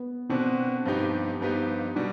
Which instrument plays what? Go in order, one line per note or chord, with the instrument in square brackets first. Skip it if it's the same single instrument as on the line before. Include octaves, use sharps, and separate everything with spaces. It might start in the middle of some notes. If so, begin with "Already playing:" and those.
Already playing: [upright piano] B3
[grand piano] B2 B3 D4 [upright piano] C4
[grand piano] G2 F3 B3 D#4 G4
G2 F3 B3 D#4 G4
[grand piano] B2 G3 [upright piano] D4